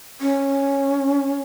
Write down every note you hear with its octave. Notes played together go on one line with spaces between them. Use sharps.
C#4